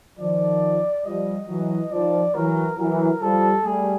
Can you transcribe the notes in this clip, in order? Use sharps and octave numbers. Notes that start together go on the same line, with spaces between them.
D#3 F3 D5
F3 G3 D#5
E3 F#3
D#3 F3 D5
E3 F#3 A#4
E3 F#3 A#4
F3 G3 A4
G3 A3 G#4